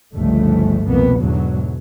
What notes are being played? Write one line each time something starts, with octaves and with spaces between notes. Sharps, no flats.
G1 C#2 G2 F3 A3
C2 F2 B2 A#3 B3
E2 G#2 B2 D3 F#3